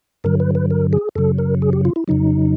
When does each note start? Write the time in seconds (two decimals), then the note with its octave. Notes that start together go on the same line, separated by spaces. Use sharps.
0.24 G2 D3 F#3 A#4
0.40 B4
0.55 B4
0.70 A#4
0.93 G#4
1.16 F#2 C#3 F#3 A4
1.38 A#4
1.62 G#4
1.73 G4
1.85 F4
1.96 E4
2.08 F2 C#3 F#3 D#4